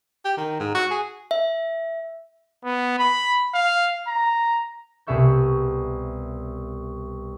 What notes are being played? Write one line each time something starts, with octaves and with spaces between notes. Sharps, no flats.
G4
D#3
G#2
F#4
G#4
E5
B3
B5
F5
A#5
C2 B2 G#4 E5 C#6 G6